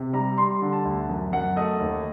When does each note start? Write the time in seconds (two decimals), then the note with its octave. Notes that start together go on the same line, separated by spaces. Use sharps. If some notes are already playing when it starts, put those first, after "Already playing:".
Already playing: C3
0.13 G3 A#5
0.38 G3 C6
0.62 D3
0.73 A5
0.85 D2
1.09 F#2
1.32 F#2 F#5
1.56 A3 D#5
1.79 D#2